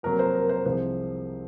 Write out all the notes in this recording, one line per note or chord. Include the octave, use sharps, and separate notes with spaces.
F2 C3 F#3 A#3 A#4
C5
A#4
C5
C2 C3 F3 G#3 C5